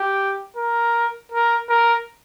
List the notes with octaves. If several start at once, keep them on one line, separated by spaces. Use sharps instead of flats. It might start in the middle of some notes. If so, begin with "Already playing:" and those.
Already playing: G4
A#4
A#4
A#4